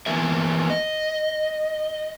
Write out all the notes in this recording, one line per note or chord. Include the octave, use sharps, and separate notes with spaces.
E3 A#3 B3 G#4 A#4 E5
D#5